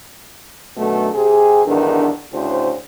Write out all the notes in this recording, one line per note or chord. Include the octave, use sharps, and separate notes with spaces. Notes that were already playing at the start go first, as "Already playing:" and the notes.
F#2 B2 D3 A3
C3 G4 G#4
E2 G2 D3 D#3 D4
D2 A2 C#3 C5